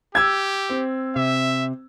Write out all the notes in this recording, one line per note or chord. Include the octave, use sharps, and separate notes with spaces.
G4 E6 G#6
C4
C3 E5